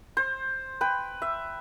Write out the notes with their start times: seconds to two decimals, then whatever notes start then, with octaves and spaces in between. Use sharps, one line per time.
0.17 C5
0.81 B4 G5
1.22 E5